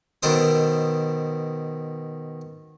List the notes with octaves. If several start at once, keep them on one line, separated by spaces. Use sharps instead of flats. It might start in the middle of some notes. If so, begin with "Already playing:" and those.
B2 D#3 A4 C5 D#6